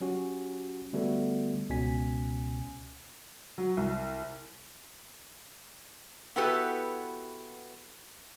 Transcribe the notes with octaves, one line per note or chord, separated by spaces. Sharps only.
F#3 C#4 F#4 G4
D3 G3 A3 B3 F#4 A4
C#2 B2 C#4 G#5 B6
F#3
C2
B3 E4 F#4 G4 A4 B4